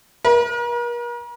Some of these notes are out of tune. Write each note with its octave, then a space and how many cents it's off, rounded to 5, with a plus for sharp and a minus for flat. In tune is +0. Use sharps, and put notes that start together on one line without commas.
A#4 +45